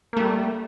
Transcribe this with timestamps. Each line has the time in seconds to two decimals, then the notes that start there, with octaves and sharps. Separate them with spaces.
0.13 A#3
0.17 A3
0.20 G3